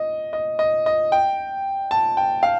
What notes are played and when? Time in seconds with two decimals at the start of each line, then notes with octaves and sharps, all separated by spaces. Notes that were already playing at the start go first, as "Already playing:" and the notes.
Already playing: D#5
0.33 D#5
0.59 D#5
0.86 D#5
1.12 G5
1.91 A5
2.17 G5
2.43 F5